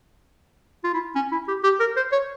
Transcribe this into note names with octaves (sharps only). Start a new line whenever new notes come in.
F4
E4
C#4
E4
G4
G4
A#4
C5
C#5